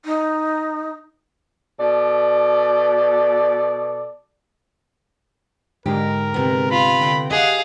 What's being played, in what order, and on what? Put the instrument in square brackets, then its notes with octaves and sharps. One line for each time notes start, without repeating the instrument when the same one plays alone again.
[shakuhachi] D#4
[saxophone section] B2 A4 D5
[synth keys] G#2 D3 G#3 [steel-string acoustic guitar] G4 [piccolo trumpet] A#4
[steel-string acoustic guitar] C3 B3
[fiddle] F4 [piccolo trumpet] B5
[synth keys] D3 G5 A#6
[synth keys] G4 [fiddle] G#4 F5 [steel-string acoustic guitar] D#5 [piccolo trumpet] F#5